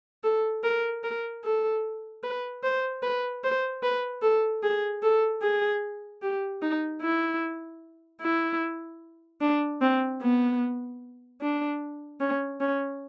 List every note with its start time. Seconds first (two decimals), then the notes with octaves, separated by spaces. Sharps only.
0.24 A4
0.64 A#4
1.03 A#4
1.44 A4
2.23 B4
2.63 C5
3.03 B4
3.44 C5
3.83 B4
4.22 A4
4.63 G#4
5.03 A4
5.42 G#4
6.22 G4
6.62 D#4
7.02 E4
8.21 E4
9.41 D4
9.81 C4
10.21 B3
11.41 D4
12.20 C#4
12.60 C#4